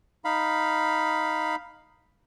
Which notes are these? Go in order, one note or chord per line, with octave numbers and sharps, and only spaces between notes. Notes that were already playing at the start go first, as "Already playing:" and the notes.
D#4 F5 B5